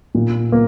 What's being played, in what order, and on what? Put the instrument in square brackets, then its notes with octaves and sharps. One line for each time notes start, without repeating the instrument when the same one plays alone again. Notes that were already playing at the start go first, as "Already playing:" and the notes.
[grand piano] A#2
A#3